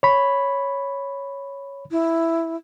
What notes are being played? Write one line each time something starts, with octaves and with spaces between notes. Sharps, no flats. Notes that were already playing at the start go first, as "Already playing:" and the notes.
C#5 B5
E4